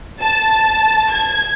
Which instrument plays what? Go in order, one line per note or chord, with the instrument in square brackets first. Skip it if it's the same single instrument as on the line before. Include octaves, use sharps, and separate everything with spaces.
[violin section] A5
G#6